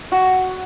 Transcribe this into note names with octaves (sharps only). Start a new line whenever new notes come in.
F#4